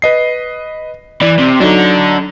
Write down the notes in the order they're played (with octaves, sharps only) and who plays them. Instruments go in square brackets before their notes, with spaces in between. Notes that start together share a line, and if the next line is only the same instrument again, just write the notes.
[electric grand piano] B4 D#5 C7
[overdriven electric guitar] E3 [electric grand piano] D5
[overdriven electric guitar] C3
[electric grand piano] F#3 D#4 [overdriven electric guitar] D4 A4